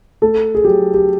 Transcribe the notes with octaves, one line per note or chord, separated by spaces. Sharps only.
A3 A4
G#4
F#3 G4
G4